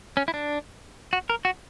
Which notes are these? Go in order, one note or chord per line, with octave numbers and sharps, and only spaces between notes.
C#4
E4
D4
F#4
A#4
F#4